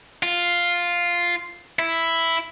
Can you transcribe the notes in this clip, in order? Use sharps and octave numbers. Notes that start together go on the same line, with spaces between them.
F4
E4